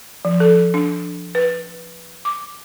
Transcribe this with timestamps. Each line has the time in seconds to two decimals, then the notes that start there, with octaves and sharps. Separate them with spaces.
0.25 F3
0.40 A4
0.74 D4
1.35 B4
2.25 D6